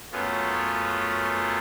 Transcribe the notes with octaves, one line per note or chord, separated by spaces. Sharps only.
F#2 A3 B3 C#4 F4